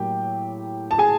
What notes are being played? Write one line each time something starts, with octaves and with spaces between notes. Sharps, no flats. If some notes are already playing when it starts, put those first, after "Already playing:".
Already playing: A2 F#3 A#3 G4 G5
A5
G#4 G#5